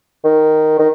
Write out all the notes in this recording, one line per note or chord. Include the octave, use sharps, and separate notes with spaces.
D#3
D#3